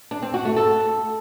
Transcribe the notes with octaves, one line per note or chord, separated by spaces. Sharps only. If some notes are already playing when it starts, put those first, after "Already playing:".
D4
C4
F#4
A3
A4